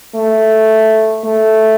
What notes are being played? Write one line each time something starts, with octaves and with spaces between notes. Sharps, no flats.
A3
A3